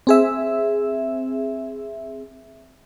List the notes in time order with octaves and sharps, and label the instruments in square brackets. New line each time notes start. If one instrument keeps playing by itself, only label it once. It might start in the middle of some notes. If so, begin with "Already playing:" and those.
[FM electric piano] C4 G#4 E5